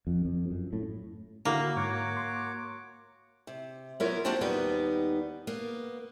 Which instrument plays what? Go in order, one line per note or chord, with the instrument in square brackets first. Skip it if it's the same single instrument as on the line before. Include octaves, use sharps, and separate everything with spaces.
[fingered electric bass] F2
F2
F#2
A2
[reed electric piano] D3 E4 F#4 [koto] A#3
[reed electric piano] G#2 [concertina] F#4 C#5 D6
[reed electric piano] C6
[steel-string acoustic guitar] C3
F#3 B3 E4 F4 A#4 C#5
A#3 D4 F#4 G4 C5 A5
D#2 G3 B3 D#4
A#3 B3